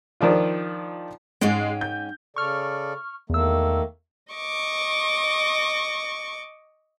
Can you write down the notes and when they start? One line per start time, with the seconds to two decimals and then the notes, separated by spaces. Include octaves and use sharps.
0.21 D#3 F3 D4 F4
1.41 G#2 G#3 C#4 G5
1.81 G6
2.36 C#3 A4 D5 C#6 F6
3.30 E2 D#3 A3 A#3 E6
4.32 D#5 C#6 D6